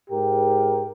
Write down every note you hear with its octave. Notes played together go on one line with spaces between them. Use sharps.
G#2 G4 A#4